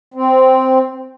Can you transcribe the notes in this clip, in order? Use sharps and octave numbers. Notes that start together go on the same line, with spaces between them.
C4